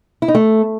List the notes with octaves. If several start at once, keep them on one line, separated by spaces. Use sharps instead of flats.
E4
D#4
A3